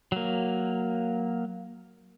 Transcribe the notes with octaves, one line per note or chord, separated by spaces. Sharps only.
F#3 A#3